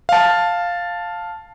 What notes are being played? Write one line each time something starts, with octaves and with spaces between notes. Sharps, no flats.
F5 A5